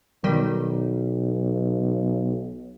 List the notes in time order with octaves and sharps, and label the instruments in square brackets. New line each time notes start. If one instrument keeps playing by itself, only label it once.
[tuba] B1 [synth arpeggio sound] D#3 G3